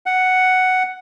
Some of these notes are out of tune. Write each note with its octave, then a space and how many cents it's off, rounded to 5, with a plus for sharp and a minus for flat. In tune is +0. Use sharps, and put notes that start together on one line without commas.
F#5 +5